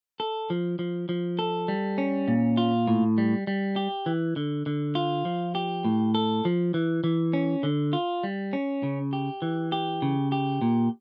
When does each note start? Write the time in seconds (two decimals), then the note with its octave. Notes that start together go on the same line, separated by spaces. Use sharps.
0.20 A4
0.50 F3
0.79 F3
1.09 F3
1.39 A4
1.68 G3
1.98 C#4
2.28 A#2
2.57 F4
2.88 A2
3.18 G3
3.47 G3
3.76 G4
4.06 E3
4.36 D3
4.66 D3
4.95 F4
5.25 F3
5.55 G4
5.85 A2
6.15 A4
6.45 F3
6.74 E3
7.04 E3
7.33 C#4
7.63 D3
7.93 F4
8.24 G3
8.53 C#4
8.83 C#3
9.13 G4
9.42 E3
9.72 G4
10.02 C#3
10.32 G4
10.62 A#2